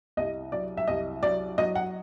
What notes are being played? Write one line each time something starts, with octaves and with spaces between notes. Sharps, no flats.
C2 D#5
F#3 D5
E5
C2 D#5
F#3 D5
F#3 D#5
F#5